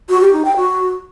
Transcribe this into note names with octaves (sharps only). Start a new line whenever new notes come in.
F#4
G4
D#4
G5
F#4